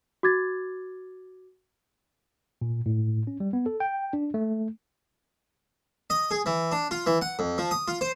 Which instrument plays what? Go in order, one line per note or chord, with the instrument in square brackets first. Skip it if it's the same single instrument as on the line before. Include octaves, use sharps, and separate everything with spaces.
[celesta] F#4 D6 G#6 A6
[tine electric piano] A#2
A2
C#4
G3
B3
A4
G5
D4
A3
[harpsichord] D#5
G#4
E3
D4
F4
E3
F#5
F2
F3
D#6
F4
C5